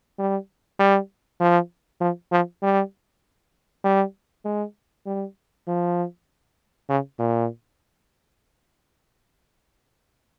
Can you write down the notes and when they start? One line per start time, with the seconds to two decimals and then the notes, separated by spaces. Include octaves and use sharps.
0.19 G3
0.79 G3
1.40 F3
2.01 F3
2.32 F3
2.63 G3
3.84 G3
4.45 G#3
5.06 G3
5.67 F3
6.89 C#3
7.19 A#2